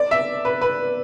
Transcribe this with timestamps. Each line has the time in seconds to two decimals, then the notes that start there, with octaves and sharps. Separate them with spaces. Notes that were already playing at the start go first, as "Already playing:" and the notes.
Already playing: D5
0.11 E5
0.45 B4
0.61 B4